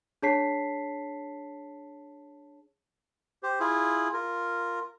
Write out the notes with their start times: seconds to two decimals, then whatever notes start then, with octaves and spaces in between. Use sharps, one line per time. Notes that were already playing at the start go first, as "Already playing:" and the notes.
0.22 D4 G#4 C#5 A5 B6 C7
3.43 G4 C5
3.60 E4 F4 G#4
4.14 F4 A#4